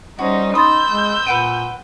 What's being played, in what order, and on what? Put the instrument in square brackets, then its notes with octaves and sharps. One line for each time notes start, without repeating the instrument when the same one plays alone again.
[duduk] G3 [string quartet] C#4 D#4 C5 [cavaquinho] F#4
[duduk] D#4 [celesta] B5 C6 A6 [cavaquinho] D#6 [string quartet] E6 G6
[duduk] G#3
[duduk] A#2 [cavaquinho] B4 F#5 G5 [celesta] D7 D#7